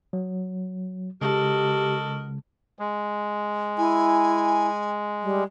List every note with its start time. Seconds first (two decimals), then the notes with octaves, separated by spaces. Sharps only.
0.13 F#3
1.21 C#3 G#3 F#4 G4 A4 A#4 D#5
2.79 G#3
3.78 E4 G#5
5.23 G3